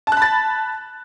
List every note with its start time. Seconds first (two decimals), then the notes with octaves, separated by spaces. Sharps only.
0.07 A5
0.12 F#6
0.17 B5
0.22 A6